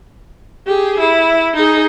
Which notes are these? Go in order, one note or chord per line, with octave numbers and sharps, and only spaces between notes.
G4 G#4
E4
D#4 G#4